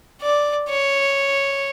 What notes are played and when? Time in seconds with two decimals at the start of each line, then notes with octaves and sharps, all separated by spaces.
0.22 D5
0.69 C#5